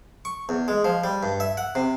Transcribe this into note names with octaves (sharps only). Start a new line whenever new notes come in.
C#6
E2
G#3
F3
G3
G2
E5
F#5
C3